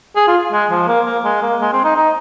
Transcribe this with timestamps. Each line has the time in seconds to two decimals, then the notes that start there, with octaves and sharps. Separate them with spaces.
0.16 G#4
0.28 F4
0.52 G#3
0.71 F3
0.88 A#3
1.06 A#3
1.24 G#3
1.42 A#3
1.61 G#3
1.73 C4
1.84 D#4
1.96 D#4